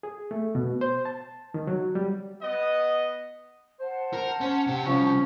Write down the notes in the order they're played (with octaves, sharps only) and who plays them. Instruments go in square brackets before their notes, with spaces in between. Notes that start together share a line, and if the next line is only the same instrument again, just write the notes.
[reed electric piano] G#4
A3
B2
C5
A5
D#3
F#3
G3
[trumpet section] B3 D#5
[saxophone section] C5 [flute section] F#5 A5
[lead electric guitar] A#4
C#4
C3 G4
[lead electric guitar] C3 G3 [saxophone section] F3 C#4